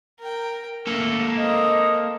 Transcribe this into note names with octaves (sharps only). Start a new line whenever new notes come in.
A#4 G5
A3 A#3 A4
C5 D#5 A#5